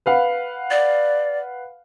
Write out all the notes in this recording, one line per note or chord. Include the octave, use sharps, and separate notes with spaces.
B4 F5 F#5
D5